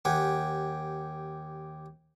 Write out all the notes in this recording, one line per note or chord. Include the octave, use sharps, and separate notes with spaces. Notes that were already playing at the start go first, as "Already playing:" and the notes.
D#2 G4 F#5 G#5